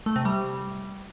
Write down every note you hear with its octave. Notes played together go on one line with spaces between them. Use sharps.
A3
C3
G3